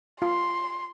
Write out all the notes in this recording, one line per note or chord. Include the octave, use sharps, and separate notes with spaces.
F4 C6